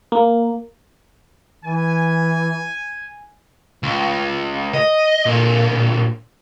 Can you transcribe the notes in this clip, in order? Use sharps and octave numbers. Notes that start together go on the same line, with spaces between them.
A#3
E3 G#5
C#2
D#5
A#2 D3